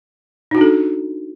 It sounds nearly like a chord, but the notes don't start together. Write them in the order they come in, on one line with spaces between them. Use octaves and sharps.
D#4 F#4 D4 A4